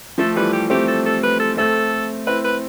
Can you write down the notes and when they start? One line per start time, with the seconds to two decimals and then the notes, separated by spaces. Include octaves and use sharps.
0.18 F3 A3 A4
0.36 E3 G3 B4
0.53 G4
0.70 A3 C4 G4
0.88 A4
1.05 A4
1.23 B4
1.39 A4
1.57 A3 C4 A4
2.27 C4 E4 B4
2.44 B4